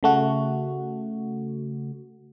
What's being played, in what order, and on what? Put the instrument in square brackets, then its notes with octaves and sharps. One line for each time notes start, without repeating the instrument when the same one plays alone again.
[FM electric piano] C#3 A3 F#4